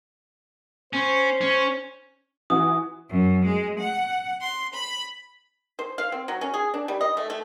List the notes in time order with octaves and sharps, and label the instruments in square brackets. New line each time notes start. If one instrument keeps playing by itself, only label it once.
[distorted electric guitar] C#4 [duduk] C5
[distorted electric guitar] C#4
[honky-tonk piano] E3 F#4 [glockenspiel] D#6
[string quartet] F#2
G#3
F#5
C6
B5
[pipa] C5
F5
C4
F#3
C#4
G#4
D4
G3
D#5
A3
A3